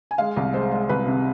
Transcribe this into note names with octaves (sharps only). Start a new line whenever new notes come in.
G#5
G#3 F5
C2
G#3 C5
G#3
C2 B4
C3